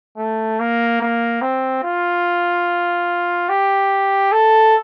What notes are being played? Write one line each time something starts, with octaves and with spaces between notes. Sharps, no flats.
A3
A#3
A#3
C4
F4
G4
A4